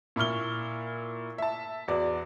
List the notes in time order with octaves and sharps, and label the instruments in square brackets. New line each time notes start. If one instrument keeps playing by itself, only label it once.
[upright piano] A#2 E4 C#6 F6 G7
E5 A5
E2 F#4 D5